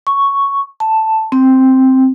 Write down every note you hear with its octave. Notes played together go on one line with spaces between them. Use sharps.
C#6
A5
C4